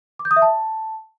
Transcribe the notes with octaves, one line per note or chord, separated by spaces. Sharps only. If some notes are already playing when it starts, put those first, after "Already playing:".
D6
G6
D#6
E5
A5